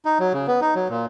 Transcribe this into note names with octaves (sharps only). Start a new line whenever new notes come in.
D#4
F#3
C#3
B3
D#4
F#3
A#2